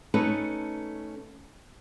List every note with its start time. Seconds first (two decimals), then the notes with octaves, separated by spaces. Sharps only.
0.14 A3 C#4 D#4 A4 B4